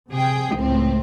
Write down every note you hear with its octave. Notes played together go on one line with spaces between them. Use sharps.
C3 G#4 G5
C#2 A2 C4